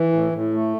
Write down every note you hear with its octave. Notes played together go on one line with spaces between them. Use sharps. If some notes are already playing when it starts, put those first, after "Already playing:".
Already playing: E3
A2
A2
A3